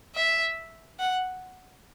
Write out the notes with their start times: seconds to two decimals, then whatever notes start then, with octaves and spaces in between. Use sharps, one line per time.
0.15 E5
1.00 F#5